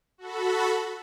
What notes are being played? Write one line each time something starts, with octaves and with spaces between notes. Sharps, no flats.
F#4 A4 B5